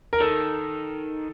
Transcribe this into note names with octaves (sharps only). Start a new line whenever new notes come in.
A#4
D#3 A4